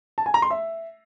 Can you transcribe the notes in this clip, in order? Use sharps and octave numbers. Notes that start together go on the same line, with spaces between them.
A5
G#5
A#5
C6
E5